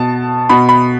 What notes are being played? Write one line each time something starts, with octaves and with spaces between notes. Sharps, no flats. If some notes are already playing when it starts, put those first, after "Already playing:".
Already playing: B2 A5
B2 B5
B5